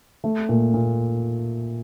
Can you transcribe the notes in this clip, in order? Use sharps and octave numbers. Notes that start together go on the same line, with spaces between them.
A3
A#2
A#2